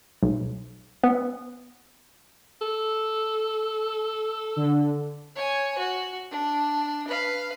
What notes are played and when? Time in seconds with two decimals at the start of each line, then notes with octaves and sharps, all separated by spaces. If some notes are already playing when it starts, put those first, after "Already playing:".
0.23 B1
1.03 B3
2.61 A4
4.56 D3
5.36 C#5 G#5
5.78 F#4
6.31 D4
7.07 B4 F5